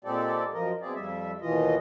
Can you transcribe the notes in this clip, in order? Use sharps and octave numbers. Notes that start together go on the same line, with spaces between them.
A#2 G#3 C4 G4 A4 D5
F#2 F3 A#4 D#5
B2 G#3 C4 G#4 D5
F2 G3 E5
D#2 B2 E3 F4 D#5